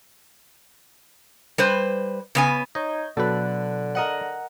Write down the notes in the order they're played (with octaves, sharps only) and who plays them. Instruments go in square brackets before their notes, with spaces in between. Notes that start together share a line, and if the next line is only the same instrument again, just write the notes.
[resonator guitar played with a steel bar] G3 B4 C5
C#3 B3 G#5
[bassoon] D#4 [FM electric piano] C#5 G6 G#6 [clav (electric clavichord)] D#5
[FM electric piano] B2 F#3 F#6 [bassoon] D3 [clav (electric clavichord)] A4 B4
[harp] A#4 D#5 F#5